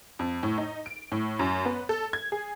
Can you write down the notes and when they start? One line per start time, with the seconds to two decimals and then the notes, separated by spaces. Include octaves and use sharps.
0.19 F2
0.43 A2
0.58 D#4
0.86 D7
1.12 A2
1.39 F#2
1.65 B3
1.89 A4
2.13 G#6
2.32 G#4